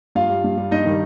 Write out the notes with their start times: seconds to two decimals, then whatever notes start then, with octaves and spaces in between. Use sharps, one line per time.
0.15 G2 F4 F5
0.30 G3
0.44 G2
0.58 G3
0.71 G2 D#4 D#5
0.86 D#3 G3